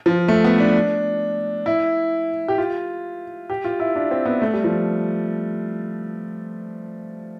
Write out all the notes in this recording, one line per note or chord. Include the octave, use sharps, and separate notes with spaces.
F3
A3
B3
D4
E4
G4
F4
G4
F4
E4
D4
C4
B3
A3
G3
F3